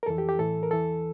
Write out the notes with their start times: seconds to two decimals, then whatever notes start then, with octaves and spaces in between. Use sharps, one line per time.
0.03 A#4
0.06 F2 E3 A4
0.18 G4
0.29 G4
0.39 A2 E3 A4
0.63 A#4
0.71 E2 E3 A4